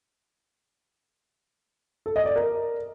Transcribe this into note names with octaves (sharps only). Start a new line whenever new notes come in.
A4
D#5
D5
A#4